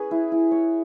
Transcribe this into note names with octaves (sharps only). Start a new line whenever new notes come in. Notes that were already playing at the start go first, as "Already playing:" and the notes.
Already playing: C#4 G#4 B4 C#5
E4
E4
C#5